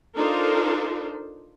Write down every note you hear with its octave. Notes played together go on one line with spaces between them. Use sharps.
D4 D#4 F4 A4 A#4 C5